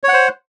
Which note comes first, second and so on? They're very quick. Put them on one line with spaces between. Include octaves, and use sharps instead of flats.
C#5 F#5 C5